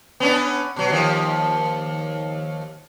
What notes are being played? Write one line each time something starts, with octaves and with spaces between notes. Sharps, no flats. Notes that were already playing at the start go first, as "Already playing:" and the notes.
B3 C#4 D4
B2 F#3
D#2 F3